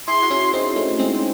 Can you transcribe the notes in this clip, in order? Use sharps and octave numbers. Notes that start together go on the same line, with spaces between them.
E4 G#4 C6
F#4
C#4 E4
C4 D#4
A3 C#4
G#3 C4